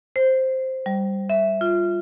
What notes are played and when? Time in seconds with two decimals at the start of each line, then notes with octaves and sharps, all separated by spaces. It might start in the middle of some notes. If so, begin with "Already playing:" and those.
0.16 C5
0.86 G3
1.29 E5
1.61 F4